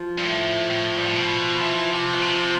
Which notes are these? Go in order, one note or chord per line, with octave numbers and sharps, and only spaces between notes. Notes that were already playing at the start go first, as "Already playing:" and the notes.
Already playing: F3
G2
A2
A2
G2
A2
B2
E3
C3
B2
C3